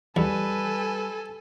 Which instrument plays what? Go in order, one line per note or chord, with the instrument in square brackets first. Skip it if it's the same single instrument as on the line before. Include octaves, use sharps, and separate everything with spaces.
[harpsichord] E2 [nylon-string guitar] G3 [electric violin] A4 G#5 [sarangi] B4